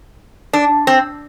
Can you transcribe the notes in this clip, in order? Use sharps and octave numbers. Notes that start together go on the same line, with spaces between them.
D4
C4